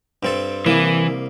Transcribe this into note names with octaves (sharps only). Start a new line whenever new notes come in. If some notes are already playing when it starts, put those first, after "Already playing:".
G2 C4 A4
C2 E3 A#3